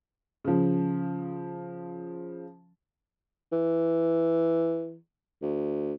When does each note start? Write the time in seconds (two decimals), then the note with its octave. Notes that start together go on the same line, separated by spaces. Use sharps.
0.44 C#3 F3
3.52 E3
5.42 D2